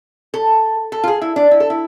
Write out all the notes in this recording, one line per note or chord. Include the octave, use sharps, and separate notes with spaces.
A4
A4
F4
G#4
E4
D4
E4
A4
E4